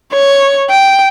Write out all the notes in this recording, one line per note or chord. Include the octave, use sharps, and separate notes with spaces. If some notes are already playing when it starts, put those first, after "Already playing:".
C#5
G5